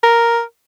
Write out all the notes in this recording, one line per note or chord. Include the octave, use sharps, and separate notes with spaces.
A#4